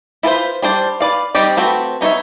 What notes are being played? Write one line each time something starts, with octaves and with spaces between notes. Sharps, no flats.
E4 F4 A4 B4 C5
G3 D4 C5 D5
B4 D5 F5
G3 C4 D#4 G4 D5
A3 C4 F#4 B4
B3 D#4 F#4 C#5 E5